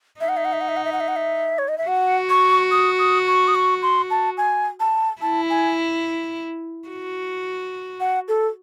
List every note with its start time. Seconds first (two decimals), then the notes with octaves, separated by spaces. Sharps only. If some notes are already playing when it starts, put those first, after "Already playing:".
0.21 D#4 E5
0.29 F#5
0.37 E5
0.45 F#5
0.53 E5
0.61 F#5
0.69 E5
0.77 F#5
0.85 E5
0.93 F#5
1.00 E5
1.08 F#5
1.16 E5
1.59 C#5
1.68 D#5
1.78 E5
1.88 F#4 F#5
2.29 C#6
2.71 D#6
2.99 D#6
3.27 C#6
3.48 D#6
3.55 C#6
3.82 C6
4.11 A5
4.38 G#5
4.80 A5
5.22 E4 A5
5.50 G#5
6.89 F#4
8.00 F#5
8.28 A4